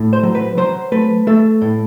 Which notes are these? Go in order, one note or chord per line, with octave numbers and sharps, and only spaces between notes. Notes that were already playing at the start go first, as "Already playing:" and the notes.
Already playing: A2
C5
F#3
B4
F#3 C5
A3 B4
A3 A4
A2